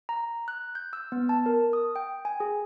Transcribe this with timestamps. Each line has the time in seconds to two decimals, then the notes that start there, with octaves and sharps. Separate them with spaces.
0.09 A#5
0.48 F#6
0.75 G6
0.93 E6
1.12 B3
1.29 A5
1.46 A#4
1.73 D#6
1.96 G5
2.25 G#5
2.40 G#4